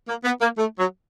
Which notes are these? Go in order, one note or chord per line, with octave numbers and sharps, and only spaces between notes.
A#3
B3
A#3
A3
F#3